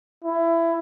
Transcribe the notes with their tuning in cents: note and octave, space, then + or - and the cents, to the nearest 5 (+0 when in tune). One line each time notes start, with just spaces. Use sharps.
E4 +20